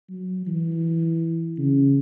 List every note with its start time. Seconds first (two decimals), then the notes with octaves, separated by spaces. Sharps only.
0.10 F#3
0.47 E3
1.58 C#3